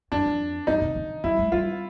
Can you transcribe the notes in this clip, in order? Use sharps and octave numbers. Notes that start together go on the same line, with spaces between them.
F#2 D4
F2
F#2 D#4
C3
D3
G3 E4
G#3
G3 F4